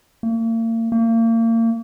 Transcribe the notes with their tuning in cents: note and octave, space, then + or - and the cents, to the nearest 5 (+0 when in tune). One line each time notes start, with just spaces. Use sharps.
A#3 -40
A#3 -35